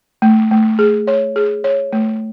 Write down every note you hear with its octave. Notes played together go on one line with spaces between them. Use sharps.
A3
A3
G#4
C#5
G#4
C#5
A3